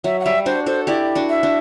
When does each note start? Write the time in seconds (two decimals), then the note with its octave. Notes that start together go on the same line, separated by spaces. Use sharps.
0.04 F#3 E5
0.20 F#5
0.25 G3 E5
0.46 D4 F#4 C5
0.66 F#4 A4 C5
0.87 E4 G4 D5
1.15 D4 F#4
1.30 E5
1.43 D4 F#4